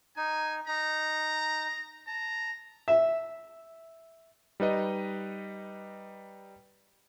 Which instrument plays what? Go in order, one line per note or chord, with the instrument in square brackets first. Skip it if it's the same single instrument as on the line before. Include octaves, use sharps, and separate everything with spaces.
[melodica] D#4 [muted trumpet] G#5
[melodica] D#4 [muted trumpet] A#5
[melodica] A5 [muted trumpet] A#5
[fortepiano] E5
[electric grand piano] G3 D#4 B4 D#5